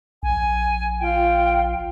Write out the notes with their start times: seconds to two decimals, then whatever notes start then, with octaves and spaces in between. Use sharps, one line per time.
0.23 A#1 G#5
1.00 F4 G5